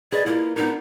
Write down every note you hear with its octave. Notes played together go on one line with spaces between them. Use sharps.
G#4 B4 D5 D#5
A#3 E4 F4
B3 D4 D#4 A#4